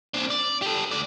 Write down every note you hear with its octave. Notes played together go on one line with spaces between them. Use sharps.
C4 D4
D5
G4 A4
D2 D5